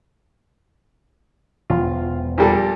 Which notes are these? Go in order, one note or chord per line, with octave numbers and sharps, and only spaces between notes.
E1 E2 F3 F4
A#2 G3 A4